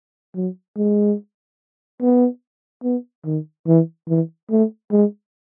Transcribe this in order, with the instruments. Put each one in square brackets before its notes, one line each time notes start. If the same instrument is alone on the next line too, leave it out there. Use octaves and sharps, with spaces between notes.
[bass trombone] F#3
G#3
B3
B3
D#3
E3
E3
A3
G#3